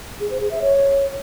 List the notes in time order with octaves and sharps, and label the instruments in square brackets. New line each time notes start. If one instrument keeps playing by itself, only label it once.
[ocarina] G#4
C5
G#4
E5
C#5